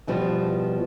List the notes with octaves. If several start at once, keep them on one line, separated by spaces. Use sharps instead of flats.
E2 B2 F3 G3